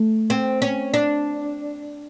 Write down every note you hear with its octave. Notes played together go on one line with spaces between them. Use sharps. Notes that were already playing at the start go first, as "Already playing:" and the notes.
Already playing: A3
C4
C#4
D4